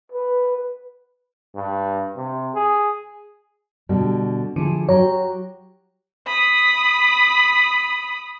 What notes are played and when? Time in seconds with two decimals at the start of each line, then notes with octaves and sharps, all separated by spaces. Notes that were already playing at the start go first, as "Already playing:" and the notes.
0.12 B4
1.55 G2
2.16 C3
2.55 G#4
3.89 B2 D3 G3
4.56 D3 F3 E4 G#4
4.89 F#3 F#4 G4 C#5 A#5
6.26 B5 D#6